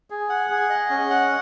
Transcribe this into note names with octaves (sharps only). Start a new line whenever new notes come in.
G#4
F#5
G#4
D#5
C#4
F#5